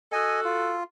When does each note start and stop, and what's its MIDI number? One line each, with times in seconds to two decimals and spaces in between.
0.12 0.78 66
0.12 0.78 69
0.12 0.40 75
0.12 0.40 80
0.45 0.84 65